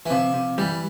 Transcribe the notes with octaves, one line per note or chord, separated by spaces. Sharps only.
E3
C3 F3
C3
E3 G3